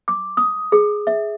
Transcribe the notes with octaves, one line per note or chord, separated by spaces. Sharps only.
D6
D#6
G#4
E5